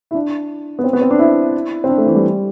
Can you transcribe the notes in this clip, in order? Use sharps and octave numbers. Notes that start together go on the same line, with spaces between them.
E4
D4
B3
C4
B3
C4
D4
E4
C4
D4
A3
E3
G3